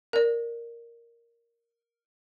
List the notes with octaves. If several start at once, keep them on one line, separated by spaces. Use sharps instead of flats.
A#4 D5